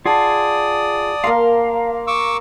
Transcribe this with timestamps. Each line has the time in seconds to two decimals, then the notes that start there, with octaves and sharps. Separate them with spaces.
0.05 F4 G#4 D5 F#5 A5 D#6
1.24 A#3 A#4 F5 C6
2.07 C#6 D6 E6